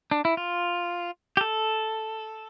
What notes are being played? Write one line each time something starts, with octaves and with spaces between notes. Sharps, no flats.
D4
E4
F4
G4
A4